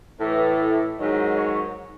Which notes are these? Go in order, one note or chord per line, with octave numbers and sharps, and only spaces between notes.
A2 E3 A4
G#2 D#3 F#3
C#5